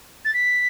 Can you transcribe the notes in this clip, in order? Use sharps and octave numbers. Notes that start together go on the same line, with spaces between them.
A6
B6